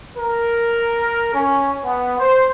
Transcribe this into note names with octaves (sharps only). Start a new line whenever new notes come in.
A#4
C#4
B3
C5